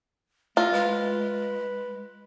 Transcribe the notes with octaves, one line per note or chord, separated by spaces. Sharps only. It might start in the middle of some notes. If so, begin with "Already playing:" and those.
A3 F4 D#5
G#3 B4